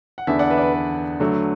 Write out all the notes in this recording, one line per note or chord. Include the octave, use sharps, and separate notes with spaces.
F#5
E2 D3 B3 D4 E5 A5
D5 F#5
B4 E5
D5
B4
B4
D3 F#3 A3